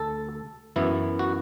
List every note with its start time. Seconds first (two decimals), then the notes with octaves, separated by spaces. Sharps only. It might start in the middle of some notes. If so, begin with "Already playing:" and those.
Already playing: D2 A4
0.76 F#2 E3 B3 E4
1.19 F#4